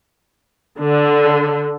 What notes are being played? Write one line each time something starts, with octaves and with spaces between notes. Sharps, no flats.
D3